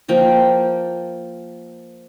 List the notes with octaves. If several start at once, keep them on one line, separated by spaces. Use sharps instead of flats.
F3 A#3 G5